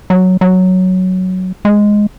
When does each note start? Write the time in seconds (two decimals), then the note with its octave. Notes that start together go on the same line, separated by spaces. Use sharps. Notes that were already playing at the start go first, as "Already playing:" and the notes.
0.10 F#3
0.41 F#3
1.65 G#3